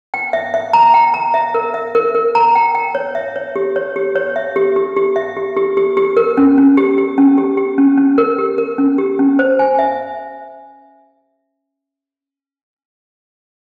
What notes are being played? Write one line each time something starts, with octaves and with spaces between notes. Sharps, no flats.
G5
E5
E5
A#5
G5
A#5
E5
A#4
E5
A#4
A#4
A#5
G5
G5
C#5
E5
C#5
G4
C#5
G4
C#5
E5
G4
G4
G4
E5
G4
G4
G4
G4
A#4
C#4
C#4
G4
G4
C#4
G4
G4
C#4
C#4
A#4
G4
A#4
C#4
G4
C#4
C5
G#5
E5